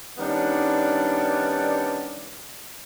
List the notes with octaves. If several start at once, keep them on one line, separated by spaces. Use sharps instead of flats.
D#3 G3 B3 C#4 D4 D5